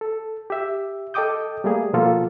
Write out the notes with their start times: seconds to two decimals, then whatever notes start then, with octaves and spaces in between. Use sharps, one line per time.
0.01 A4
0.50 G4 E5
1.14 A4 D#5 G5 D6 D#6 G6
1.64 G3 A3 A#3 G#4
1.93 B2 F3 A#3 F4 F#4 A4